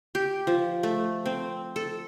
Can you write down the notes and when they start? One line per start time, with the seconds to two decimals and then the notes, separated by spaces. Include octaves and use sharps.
0.15 G4
0.47 F3
0.83 A3
1.26 C4
1.76 A4